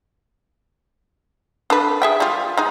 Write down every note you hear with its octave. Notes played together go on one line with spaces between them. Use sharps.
D4 A4 B4
G#4 E5 G5
G3 F4
G#3 D#4